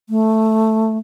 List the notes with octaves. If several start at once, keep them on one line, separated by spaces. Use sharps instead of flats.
A3